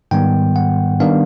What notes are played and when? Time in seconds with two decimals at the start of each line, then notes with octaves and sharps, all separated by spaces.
0.11 G#2 D#3 G3 B3 G5
0.56 F#5
1.00 D#3 G3 B3 D4 F5